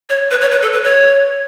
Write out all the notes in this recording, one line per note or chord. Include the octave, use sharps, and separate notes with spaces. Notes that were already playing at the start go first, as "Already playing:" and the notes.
C#5
B4
C#5
B4
A4
B4
C#5